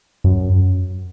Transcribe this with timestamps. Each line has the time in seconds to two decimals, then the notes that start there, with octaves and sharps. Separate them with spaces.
0.24 F#2